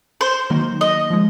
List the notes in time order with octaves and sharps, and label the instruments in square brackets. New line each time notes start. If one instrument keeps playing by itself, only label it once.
[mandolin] C5
[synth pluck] D#3 F#3 A#3 D#4 F#4
[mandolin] D#5
[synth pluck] F3 G#3